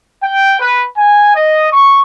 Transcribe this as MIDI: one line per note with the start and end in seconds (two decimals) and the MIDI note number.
0.23 0.59 79
0.60 0.85 71
0.97 1.34 80
1.35 1.66 75
1.72 2.02 85